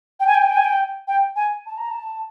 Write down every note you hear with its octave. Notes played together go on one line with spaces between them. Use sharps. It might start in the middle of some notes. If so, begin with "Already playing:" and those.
G5
G#5
G5
G#5
G5
G#5
G5
G5
G#5
A5
A#5
A5